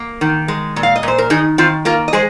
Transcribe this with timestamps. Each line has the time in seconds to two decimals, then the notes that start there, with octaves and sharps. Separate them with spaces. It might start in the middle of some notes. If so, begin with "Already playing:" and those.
Already playing: A#3
0.21 D#3
0.48 G#3
0.76 A#2
0.83 F5
0.96 D#5
1.03 A#2 C5
1.18 A#4
1.30 D#3 D#4 G#4
1.58 D#3 C4 F4
1.85 A#3 F4 A#4
2.08 D#5
2.13 G#3 G#4 C5